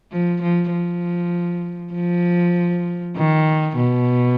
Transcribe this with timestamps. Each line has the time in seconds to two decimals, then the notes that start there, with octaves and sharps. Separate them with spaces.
0.12 F3
0.42 F3
0.72 F3
1.93 F3
3.16 D#3
3.76 B2